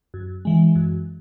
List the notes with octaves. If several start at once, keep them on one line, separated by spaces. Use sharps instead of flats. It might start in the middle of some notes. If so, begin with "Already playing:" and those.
F#2
E3 G#3
F#2